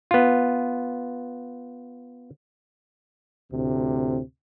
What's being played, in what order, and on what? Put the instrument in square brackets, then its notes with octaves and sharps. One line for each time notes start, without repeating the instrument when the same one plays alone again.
[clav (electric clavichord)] B3 F4
[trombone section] D2 A2 C3 C4